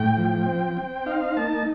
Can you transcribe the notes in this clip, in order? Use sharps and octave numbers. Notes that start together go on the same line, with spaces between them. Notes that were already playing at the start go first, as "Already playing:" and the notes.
Already playing: A2 G5
F3
C4
C4
D#4 F5
A#3 A5